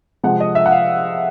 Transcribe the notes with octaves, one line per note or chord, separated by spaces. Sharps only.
C3 F3 G#3 F#5
D#5
E5
F#5
F5